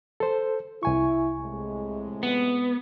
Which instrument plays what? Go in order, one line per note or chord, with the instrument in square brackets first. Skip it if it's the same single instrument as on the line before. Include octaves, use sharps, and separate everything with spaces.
[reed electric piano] A4 C5
[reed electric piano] C2 G#5 C#6 [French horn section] E4
[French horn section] A2 C3 G#3
[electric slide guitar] B3